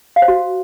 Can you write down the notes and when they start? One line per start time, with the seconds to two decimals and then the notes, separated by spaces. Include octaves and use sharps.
0.16 F5
0.22 C5
0.28 F#4